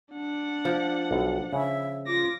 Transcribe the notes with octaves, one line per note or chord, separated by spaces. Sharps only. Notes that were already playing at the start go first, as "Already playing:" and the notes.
D4 F#5
F3
B1
C#3 E5
F4 D6 A#6